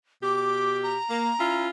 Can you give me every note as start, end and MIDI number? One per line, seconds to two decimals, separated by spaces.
0.23 0.97 47
0.23 0.97 67
0.23 0.78 86
0.83 1.65 82
1.10 1.32 58
1.40 1.70 61
1.40 1.70 64
1.40 1.70 65